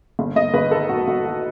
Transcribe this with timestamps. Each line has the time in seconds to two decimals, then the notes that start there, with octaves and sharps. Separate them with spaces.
0.19 G1
0.36 G1 D#5
0.54 G1 B4
0.71 D#3 A4
0.89 G1 F#4
1.07 G1 F#4
1.25 D#3 F#4